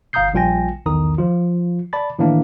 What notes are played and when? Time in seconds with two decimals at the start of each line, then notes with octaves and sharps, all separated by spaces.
0.13 G1 F5 A#5 D#6 G6 C7
0.34 A#1 G3 F4 G5 G#5 A#6
0.86 B1 E2 D#3 A#5 D#6
1.18 F3 F4
1.93 D5 A5 B5 A6
2.19 A2 D#3 E3 A#3 D4